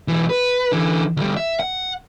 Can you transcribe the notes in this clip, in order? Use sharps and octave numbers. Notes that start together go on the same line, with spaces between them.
B1 E3
B4
D3 E3
D2 G3
E5
F#5